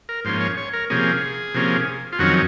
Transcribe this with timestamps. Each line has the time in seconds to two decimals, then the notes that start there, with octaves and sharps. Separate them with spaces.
0.09 A#4
0.25 G#2 F3 A#3 C#4 C5
0.41 C#5
0.57 C#5
0.73 A#4
0.90 C3 F3 A#3 C#4 G#4
1.54 C3 F3 A#3 C#4
2.13 F4
2.19 F2 D#3 F#3 C#4 F#4